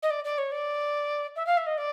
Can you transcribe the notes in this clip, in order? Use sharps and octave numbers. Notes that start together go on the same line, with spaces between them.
D#5
D5
D5
C#5
D5
E5
F5
E5
D#5
D5